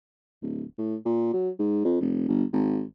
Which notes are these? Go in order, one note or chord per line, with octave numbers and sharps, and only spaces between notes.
D1
A2
A#2
F#3
G#2
F2
F1
G1
G#1